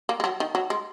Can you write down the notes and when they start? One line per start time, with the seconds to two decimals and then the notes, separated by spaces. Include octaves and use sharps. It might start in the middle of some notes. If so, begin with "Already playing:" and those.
0.09 A#3
0.20 G#3
0.24 F#3
0.40 D#3
0.55 F#3
0.70 G#3